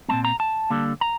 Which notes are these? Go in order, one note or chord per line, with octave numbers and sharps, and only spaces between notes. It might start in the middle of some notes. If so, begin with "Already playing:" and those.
A#2 A3 C4 A5
A#5
A5
D3 G3 A#3
A#5